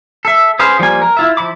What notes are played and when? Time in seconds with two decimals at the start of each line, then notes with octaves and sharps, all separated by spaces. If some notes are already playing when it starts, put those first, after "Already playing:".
0.25 A4 E5
0.59 C#4 G#4 B4 C5 F5
0.79 F3 G3 A#3 G#5
1.02 A#4
1.17 E4 F4 E5
1.37 F3 E4 B5 D6